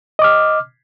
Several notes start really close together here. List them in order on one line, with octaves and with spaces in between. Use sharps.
D#5 D6 F6